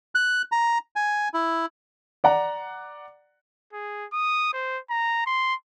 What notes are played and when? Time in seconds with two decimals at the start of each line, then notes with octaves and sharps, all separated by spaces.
0.15 F#6
0.52 A#5
0.96 G#5
1.34 E4
2.24 D5 F#5 A#5
3.73 G#4
4.13 D#6
4.53 C5
4.90 A#5
5.27 C6